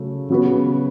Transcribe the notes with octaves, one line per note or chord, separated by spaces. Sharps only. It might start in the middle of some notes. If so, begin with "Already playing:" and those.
Already playing: C#3 F#3 A3
C#3 F#3 B3 F#4 B4